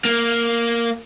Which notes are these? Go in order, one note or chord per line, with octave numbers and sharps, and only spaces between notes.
A#3